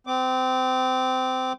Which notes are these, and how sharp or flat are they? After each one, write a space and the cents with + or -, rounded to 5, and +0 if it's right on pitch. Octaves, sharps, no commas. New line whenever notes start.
C4 -25 D6 +0